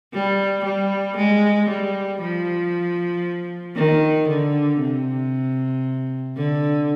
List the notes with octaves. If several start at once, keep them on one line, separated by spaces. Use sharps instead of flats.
G3
G3
G#3
G3
F3
D#3
D3
C3
D3